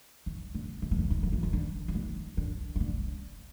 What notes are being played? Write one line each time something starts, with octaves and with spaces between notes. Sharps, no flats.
D#3
D3
D#3
E3
D#3
D#3
F3
E3
D#3
D3
E3
D#3
D3
D#3
D3